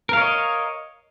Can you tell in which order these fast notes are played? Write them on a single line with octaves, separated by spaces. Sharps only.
A#4 F5 C#5 D#5